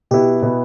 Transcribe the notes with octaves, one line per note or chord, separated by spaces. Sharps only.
B2 B3 E4 G4
B2 B3 E4